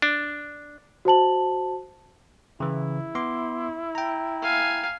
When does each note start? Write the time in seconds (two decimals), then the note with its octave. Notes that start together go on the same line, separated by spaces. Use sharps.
0.02 D4
1.05 F#4 C5 A5 F#7
2.60 C#3 E3 E4
3.15 B3 C6 D6
3.95 G5 A#5
4.42 F5 G#5